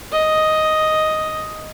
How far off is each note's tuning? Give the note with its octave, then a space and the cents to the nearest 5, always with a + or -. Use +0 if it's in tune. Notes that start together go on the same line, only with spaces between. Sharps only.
D#5 +5